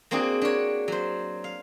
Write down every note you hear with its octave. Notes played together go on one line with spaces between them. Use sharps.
A#3 C4 D4 F#4 G#4
D4 A#4 C#5
F#3 C5
F5